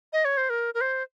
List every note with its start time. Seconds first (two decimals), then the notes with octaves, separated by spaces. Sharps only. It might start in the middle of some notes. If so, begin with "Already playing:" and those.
0.13 D#5
0.25 C#5
0.37 C5
0.50 A#4
0.74 A#4
0.81 C5